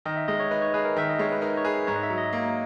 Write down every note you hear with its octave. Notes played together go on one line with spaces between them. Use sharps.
D#3 D#5
E5
G#3 D#5
C#5
D#4 B4
C#5
G#4 B4
A#4
D#3 E5
D#5
G#3 C#5
B4
D#4 A#4
C#5
G#4 B4
G#2 C#5
D#5
E5
F#3
D#5
A#3